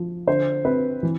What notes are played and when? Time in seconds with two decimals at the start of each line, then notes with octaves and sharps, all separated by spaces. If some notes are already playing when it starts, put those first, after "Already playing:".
Already playing: F3
0.27 D3 C5
0.65 C4 B4
1.03 E3